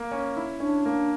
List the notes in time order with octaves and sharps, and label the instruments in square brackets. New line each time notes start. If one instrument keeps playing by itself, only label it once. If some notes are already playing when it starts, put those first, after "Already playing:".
Already playing: [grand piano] A#3
C#4
E4
[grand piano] C#4 [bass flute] D4
[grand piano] A#3